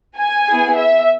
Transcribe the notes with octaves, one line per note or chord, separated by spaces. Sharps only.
G#5
B3 E4 G#4
E5